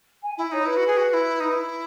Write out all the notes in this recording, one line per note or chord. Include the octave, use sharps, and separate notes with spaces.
G#5
E4 E5
D#4 C#5
E4 B4
F#4
G#4
F#4
F#4
E4
D#4
E4